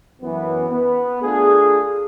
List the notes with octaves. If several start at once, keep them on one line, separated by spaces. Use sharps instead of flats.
F#2 E3 B3
B3
A3 D4 F4 G#4